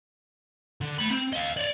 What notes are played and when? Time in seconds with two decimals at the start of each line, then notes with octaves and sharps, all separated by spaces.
0.81 D3
0.99 A3 B5
1.10 C4
1.33 D#5 F5
1.57 C#5 D5